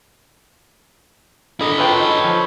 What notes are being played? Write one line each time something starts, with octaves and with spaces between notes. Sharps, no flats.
D3 G#4 A#4 D#5 B5
F4 A4 B4 C#5 G5 B5
D#4
F3